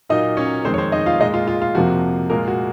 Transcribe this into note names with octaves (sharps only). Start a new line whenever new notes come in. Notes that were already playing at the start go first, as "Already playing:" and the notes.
A#2 F#3 A#3 D#4 D#5
C#4 C#5
F2 D#3 G#3 C4 C5
C#5
C4 C5
D#4 D#5
F4 F5
A#2 G#3 D#4 D#5
F4
F4
F4
F2 C3 F3 A#3 F#4
A#2 G#3 A#3 A#4
F#4